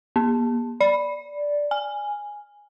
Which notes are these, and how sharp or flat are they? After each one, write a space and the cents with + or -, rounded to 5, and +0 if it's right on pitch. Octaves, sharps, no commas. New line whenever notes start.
A#3 +45
D5 -5
G#5 -5